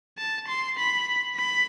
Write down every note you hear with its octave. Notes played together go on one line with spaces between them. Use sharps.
A5
C6
B5
B5